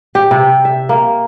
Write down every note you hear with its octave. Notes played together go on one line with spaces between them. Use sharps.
G4
C3
E5
A#3